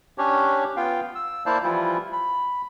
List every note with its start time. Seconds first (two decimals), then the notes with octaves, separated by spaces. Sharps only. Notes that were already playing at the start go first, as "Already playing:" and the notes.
0.18 C#4 D4 G4 C#5
0.77 B3 F4 F5 G5
1.15 E6
1.46 A#3 E4 C5 D5 F5 A5
1.63 E3 F3 G3 E4 F4
2.13 B5